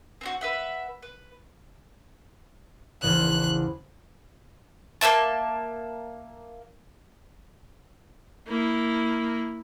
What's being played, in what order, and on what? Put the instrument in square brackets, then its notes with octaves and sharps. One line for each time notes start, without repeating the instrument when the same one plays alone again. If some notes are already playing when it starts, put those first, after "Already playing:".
[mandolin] C4 D#4 F#4
B4 E5 F#5
B4
[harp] A#1 E2 C#3 [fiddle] F#6
[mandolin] A#3 C#4 E5 A5
[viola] A#3 E4